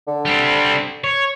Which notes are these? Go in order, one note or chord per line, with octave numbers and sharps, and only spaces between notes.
D3
G3 C4
C#5